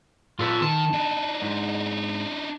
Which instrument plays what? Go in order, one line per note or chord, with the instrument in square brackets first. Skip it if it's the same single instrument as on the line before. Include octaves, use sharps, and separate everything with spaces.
[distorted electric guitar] A#2 [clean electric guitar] F4 A4 B4
[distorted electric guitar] D#3 [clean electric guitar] A5
[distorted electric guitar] D4 D#4
[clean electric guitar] G#2